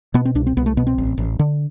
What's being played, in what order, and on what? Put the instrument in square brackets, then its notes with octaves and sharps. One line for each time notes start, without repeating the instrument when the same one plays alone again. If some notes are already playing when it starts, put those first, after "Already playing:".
[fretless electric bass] B2 B3
C4
C2 D4
C4
C2 B3
A3
B2 B3
C4
A1
A1
D3